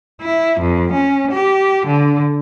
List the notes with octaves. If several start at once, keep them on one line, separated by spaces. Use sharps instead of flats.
E4
F2
C#4
G4
D3